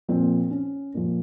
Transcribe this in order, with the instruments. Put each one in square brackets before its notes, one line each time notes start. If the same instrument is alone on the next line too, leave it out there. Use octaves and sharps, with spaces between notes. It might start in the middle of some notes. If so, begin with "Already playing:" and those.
[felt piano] A#2 F3 C4
C#4
A#2 F3